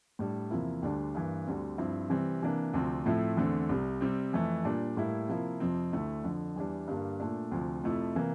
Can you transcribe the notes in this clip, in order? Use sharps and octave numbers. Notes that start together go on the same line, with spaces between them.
A2 G3 D4
E2 C3 F3 A#3 E4
D2 D3 G3 D4
G2 E3 A#3
D2 D3 G3 C4
G2 F3 C4 E4
C3 E3 G3 C4
C3 E3 A#3 D4
D2 C3 F3 C4
A2 F3 A3 C4 E4
E2 D3 A3 C4
C2 C3 G3
C3 G3 C4
F2 E3 A3
A#2 G3 D4
A2 G3 A#3 E4
C3 F3 A#3 E4
F2 C3 F3 C4
D2 D3 A3 E4
F2 D3 F3
E2 E3 G3 D4
G2 D3 G3 A#3 D4
A#2 A3 D4
D2 C3 F3
F2 C3 F3 A3 E4
C3 E3 A#3